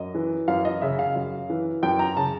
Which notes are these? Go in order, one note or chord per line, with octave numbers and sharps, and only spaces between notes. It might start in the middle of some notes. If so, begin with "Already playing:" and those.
Already playing: F#2 D#5
E3
F#2 F5
D#5
C#3 E5
F5
F#2
E3
F#2 G5
A#5
C#3 A5